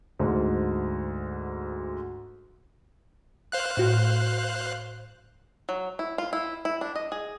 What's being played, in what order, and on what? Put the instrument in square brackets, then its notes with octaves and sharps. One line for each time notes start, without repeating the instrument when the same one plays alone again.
[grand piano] D2 G#2
[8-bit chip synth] C5 F5 F#6
[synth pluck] A2 F#4 G6
[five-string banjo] F#3
E4
F4
E4
E4
D4
D#5
G#4